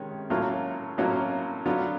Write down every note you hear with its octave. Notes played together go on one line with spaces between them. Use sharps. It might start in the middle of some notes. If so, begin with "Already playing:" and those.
Already playing: C3 D#3 G#3 C#4
A2 F#3 A#3 C#4 F4
A2 F#3 A#3 C#4 F4
D3 F#3 B3 D4 F4